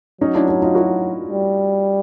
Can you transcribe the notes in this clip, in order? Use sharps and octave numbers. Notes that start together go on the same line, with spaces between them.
F#3 C#4 D#4
D4 E4
D4 E4
D#4 F4
E4 F#4
G3